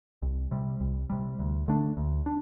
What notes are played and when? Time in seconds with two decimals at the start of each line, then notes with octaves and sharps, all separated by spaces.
0.22 C2
0.51 C3 G3
0.80 C2
1.10 C3 G3
1.39 D2
1.68 D3 A3 D4
1.97 D2
2.26 D4